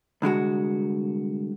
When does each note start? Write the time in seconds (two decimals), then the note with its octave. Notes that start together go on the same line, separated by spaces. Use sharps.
0.22 C2 D3 G#3 F#4